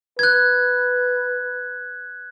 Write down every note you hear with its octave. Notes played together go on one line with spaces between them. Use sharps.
B4 F#6 G#6